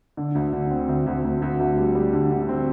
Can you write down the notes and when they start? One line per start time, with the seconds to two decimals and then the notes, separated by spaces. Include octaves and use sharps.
0.17 D3
0.35 D2
0.53 D3
0.71 C4
0.89 D2
1.07 D2
1.24 D2
1.42 D2
1.60 D2
1.77 G3
1.95 G3
2.13 D3
2.31 D3
2.49 C4